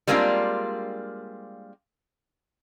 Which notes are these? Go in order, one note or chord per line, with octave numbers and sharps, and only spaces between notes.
G3 G#3 A#3 C4 D4 F4